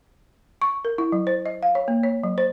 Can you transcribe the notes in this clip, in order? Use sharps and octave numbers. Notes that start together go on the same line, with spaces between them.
C#6
A#4
E4
F#3
C5
D#5
F5
C#5
A#3
C#5
F#3
C5